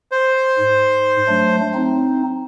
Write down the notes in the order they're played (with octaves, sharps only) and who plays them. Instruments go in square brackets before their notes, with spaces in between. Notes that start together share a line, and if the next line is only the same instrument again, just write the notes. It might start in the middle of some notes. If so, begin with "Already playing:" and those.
[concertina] C5
[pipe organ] G#2
F#3 A3 D4
C4 D#4